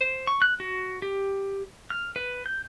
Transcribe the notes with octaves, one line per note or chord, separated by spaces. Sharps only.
C5
C#6
F#6
F#4
G4
F6
B4
G6